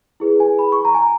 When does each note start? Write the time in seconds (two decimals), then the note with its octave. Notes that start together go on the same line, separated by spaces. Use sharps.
0.20 E4 G#4 B4
0.40 G#5
0.59 B5
0.72 C#6
0.85 A#5
0.94 G#5
1.02 A#5